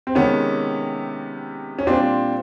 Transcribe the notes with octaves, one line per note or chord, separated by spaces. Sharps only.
C4
C3 D#3 G#3 B3 C#4
C#4
A#2 G3 C4 D4